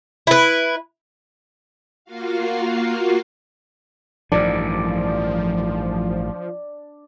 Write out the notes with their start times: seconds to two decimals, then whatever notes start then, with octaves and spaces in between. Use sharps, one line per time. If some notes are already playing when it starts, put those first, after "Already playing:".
0.27 E4 B4
2.05 A#3 F4 F#4 F5
4.32 A1 G2 D#3 F3 D4